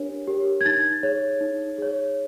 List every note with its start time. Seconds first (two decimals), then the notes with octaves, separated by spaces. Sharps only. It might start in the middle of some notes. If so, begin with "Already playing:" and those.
Already playing: D4 G4 A#4 C#5
0.27 G4 A#4 C#5
0.61 G#6
0.65 D#4 A6
1.03 G#4 C#5
1.41 D#4
1.78 G#4 C#5